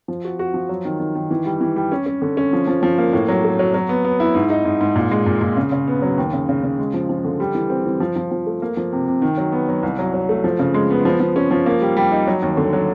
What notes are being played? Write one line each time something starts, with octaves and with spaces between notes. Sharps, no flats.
F3
F#4
F#4
F3
F#3
D#3
D#3
D#3
E3
G3
E3
G3
C#4
C#4
D3
C#4
F3
F3
F3
A#3
A2
F#3
A3
F#3
F#3
B3
B3
E4
G#2
D#4
G#2
G#2
A#2
G#3
A#2
A#2
C#3
C#3
B3
F#3
D#2
C#3
C#3
C#3
G#3
F3
F3
D3
G3
E3
C4
E3
F3
F3
F3
A3
A#3
F3
C3
C3
D#3
F#3
B3
F#3
C2
F#3
F#3
A3
F3
C#3
G#3
B3
F3
F3
C#4
F3
A#3
G3
G3
D#4
F#3
D#2
D3
F#3